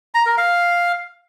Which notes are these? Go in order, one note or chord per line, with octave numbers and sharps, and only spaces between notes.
A#5
A#4
F5